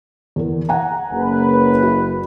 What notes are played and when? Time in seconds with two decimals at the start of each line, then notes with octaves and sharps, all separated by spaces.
0.36 E2 A#4
0.69 F#5 G#5 A#5
1.11 F#1 B4
1.83 F#4